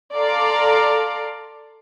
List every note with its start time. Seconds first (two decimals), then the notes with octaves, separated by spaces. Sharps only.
0.14 A4 D5 F5 A#5 C6 D6